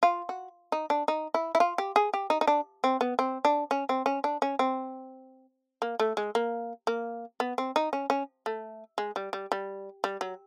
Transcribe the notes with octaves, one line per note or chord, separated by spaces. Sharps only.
F4
F#4
D#4
D4
D#4
E4
E4
F4
G4
G#4
G4
D#4
D#4
D4
C4
B3
C4
D4
C#4
C4
C#4
D4
C#4
C4
A#3
A3
G#3
A#3
A#3
B3
C4
D#4
C#4
C#4
A3
G#3
G3
G3
G3
G3
F#3